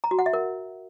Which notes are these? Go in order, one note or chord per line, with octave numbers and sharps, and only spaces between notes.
A#5
F#4
F#5
E5
A#4